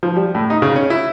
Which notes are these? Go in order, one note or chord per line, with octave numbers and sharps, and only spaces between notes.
F3
G3
A2
D#4
C#3
C#4
E4